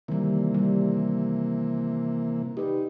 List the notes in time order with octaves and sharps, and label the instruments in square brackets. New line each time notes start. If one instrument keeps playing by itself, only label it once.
[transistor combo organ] C3 E3 A#3 [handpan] D#3 G3
[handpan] G3
[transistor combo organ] D#4 [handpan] G4 B4